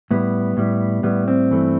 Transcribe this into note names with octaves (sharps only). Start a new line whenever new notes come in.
A2 G3 B3
A2 G3
A2 G3 B3
C4
G2 E3 A3